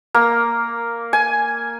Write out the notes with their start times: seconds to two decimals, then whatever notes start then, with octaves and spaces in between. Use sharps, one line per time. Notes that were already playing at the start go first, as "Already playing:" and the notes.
0.14 A#3
1.13 G#5